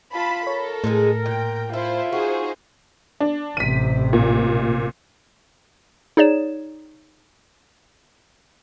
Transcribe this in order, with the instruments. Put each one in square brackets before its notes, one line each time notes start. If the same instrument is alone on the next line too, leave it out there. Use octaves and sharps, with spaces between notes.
[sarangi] F4 [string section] A5 B5
[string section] A4 [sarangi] A#4 [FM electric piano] C#5
[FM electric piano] A2 [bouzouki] G#3 C4 G#4
[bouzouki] A#2 [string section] G5
[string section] E4 C5 [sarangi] F4 [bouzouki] A4
[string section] D#4 G#4 C5 [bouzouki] F#4
[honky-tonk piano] D4
[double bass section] A1 C3 [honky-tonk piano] B6 D#7
[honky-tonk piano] A#2
[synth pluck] D#4 G#4 C#5 D5 E7